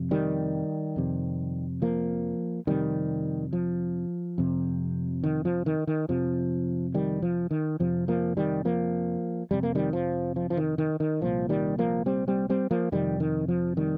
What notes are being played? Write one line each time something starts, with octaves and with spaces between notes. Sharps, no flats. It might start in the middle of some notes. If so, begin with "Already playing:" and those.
Already playing: F2 C3
D#3 G3
F2 C3
F3 A#3
F2 C3 D#3 G3
F3
F2 C3
D#3
F3
D#3
D#3
F2 C3 F3
D#3 G3
F3
D#3
F2 C3 F3
F3 A#3
D#3 G3
F3 A#3
F2 C3 G3
A#3
D#3 G3
F3
F3
F3
D#3
D#3
D#3
C2 A#2 F3
D#3 G3
F3 A#3
G3 C4
G3 C4
G3 C4
F3 A#3
F2 C3 D#3 G3
D#3
F3
D#3 G3